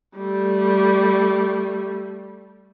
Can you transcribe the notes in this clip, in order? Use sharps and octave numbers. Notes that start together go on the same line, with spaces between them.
G3 A3